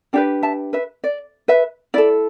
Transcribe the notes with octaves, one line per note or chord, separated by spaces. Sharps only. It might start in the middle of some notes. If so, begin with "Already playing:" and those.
D4 G4 B4 D5 G5
E5 A5
B4 E5
D5
B4 E5
E4 A4 D5